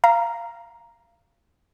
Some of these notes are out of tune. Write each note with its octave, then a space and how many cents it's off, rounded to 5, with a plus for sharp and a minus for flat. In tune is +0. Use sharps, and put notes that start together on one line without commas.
F5 -25 A#5 +0